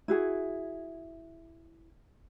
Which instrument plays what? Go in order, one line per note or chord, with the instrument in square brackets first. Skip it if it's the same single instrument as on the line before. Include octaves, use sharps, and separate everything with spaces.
[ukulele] E4 F#4 G#4